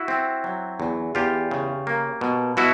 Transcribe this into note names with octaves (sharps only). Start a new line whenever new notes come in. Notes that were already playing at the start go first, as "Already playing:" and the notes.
Already playing: E4 F#4
C4
F#3
E2
E2 F4 G4
C#3
A#3
B2
B2 E4 F#4